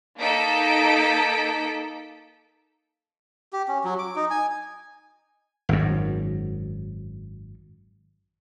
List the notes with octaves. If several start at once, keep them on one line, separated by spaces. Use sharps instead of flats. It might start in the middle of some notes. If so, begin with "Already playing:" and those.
A#3 D#4 A4 B6 D7
G4
C#4
F#3
D6
D#4
G#5
G#1 F#2